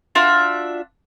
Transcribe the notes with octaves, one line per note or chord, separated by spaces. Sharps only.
D4 F4 F#4 E5